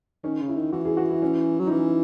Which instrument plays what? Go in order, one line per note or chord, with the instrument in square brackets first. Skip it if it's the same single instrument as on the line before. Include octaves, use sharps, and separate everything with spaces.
[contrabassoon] D#3 [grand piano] C#4
[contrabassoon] C#3
[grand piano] E4
[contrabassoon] D#3
[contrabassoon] E3 [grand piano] F#4
[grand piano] G#4
F#4
E4
C#4
[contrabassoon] F#3
[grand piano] D#4
[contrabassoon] E3 [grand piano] C#4